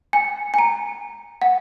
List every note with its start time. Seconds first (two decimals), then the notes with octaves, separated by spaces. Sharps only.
0.13 G#5
0.54 G#5
0.59 A#5
1.42 F#5